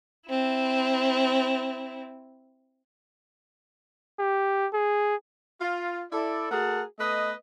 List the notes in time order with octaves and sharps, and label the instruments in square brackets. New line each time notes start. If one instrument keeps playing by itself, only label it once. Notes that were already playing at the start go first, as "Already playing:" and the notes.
[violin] C4 E4
[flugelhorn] G4
G#4
[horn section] F4
E4 A4 D5
A3 F#4 G#4 A#4 F#5 A5
A3 B3 B4 D#5